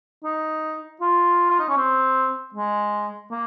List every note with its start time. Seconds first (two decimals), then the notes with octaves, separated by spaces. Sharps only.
0.24 D#4
1.01 F4
1.50 F4
1.59 D#4
1.69 C#4
1.77 C4
2.54 G#3
3.31 A#3